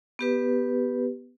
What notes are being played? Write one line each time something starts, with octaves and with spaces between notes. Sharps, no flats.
B3 G4 B4